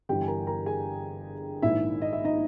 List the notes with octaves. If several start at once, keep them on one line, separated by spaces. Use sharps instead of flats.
G1 G2 E3 G4 G5
G#5
A#4 A#5
A#4 A#5
G#4 G#5
A#1 G#2 D#3 E4 E5
D#5
E5
D#4 D#5